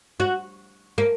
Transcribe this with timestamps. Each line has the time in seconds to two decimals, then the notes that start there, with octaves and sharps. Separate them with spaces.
0.20 F#4
0.98 A#3